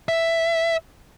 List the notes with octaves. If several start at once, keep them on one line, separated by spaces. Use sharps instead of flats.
E5